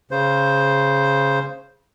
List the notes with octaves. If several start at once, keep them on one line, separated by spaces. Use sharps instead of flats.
C#3 C5